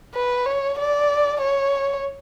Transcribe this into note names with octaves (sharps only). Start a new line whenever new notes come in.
B4
C#5
D5
C#5